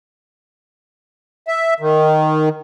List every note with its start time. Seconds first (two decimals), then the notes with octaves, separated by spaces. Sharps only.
1.48 E5
1.80 D#3